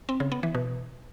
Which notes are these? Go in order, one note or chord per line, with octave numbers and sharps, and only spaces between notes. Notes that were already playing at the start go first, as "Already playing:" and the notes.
C4
C#3
B3
E3
B2